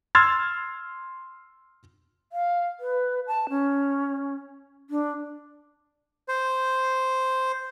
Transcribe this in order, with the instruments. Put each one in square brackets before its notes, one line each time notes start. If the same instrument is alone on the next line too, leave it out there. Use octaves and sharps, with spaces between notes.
[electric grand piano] C6 E6 F6 G#6 A6
[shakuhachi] F5
B4
A5
C#4
D4
[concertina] C5